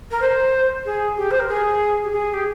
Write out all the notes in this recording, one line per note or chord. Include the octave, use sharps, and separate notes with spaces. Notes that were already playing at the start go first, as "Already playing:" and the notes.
A#4
C5
G#4
G4
C5
A#4
G#4
G4
G#4
G4